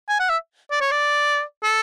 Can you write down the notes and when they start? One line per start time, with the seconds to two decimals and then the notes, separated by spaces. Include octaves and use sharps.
0.09 G#5
0.19 F#5
0.29 E5
0.71 D5
0.81 C#5
0.91 D5
1.63 A4